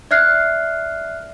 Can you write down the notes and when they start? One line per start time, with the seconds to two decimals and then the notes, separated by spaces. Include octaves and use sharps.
0.11 D5 E5 F6 F#6 C7